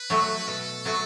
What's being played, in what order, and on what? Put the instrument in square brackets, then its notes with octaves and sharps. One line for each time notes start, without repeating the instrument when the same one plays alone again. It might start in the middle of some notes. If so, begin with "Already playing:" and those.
Already playing: [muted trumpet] B4
[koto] F#3 A3 F#4
[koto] B2 [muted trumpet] A4
[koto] F#3 A3 F#4